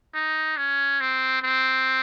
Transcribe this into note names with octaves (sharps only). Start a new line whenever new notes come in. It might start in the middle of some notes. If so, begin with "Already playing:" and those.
D#4
C#4
C4
C4